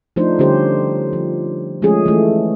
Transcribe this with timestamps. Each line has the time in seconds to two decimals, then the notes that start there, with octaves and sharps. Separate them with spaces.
0.16 F3 A3 D4 D#4 C5
0.39 D3 G3 C#4 G4 C5
1.13 F3
1.82 F3 G#3 A3 C#4 G#4
2.06 E3 A3